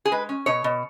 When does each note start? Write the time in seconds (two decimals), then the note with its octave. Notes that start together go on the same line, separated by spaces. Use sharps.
0.05 G#4
0.12 G#3 B4
0.29 C#4
0.46 B2 C#5
0.64 B2